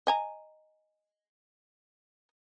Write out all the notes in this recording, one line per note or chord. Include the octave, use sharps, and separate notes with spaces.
D#5 G#5 A#5